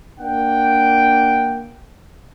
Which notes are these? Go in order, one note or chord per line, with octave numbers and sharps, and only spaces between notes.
A#3 D4 F#5 G5